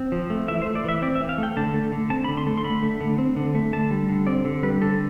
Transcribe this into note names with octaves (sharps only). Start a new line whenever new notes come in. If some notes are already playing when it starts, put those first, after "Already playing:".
Already playing: C4
F3
A3
E3 E5
C5
A3
D5
E3 E5
C4 D5
E5
E3
F5
A3 G5
D3 A5
A3
D3
C4 A5
B5
D3
C6
A3
C6
D3 B5
A3
D3
C4
D3
A3
D3 A5
G3
D3
C4 D5
D3
G3 B4
D3 A4